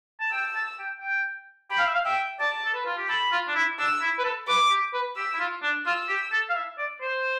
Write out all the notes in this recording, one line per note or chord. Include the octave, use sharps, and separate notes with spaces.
A5
G5 E6
A5
G5
G5
G5 B5
F5
E5
F5
E5 G5
D5 A5
A4
B4
F4
G4
A4 B5
F4
D4
E4
D4 E6
E4
B4
A4
B4 D6
G4
B4
G4 E6
E4
F4
D4
F4 E6
G4
A4
F5
E5
D5
C5